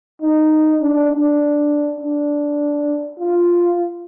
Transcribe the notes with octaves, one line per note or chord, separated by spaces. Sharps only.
D#4
D4
D4
D4
F4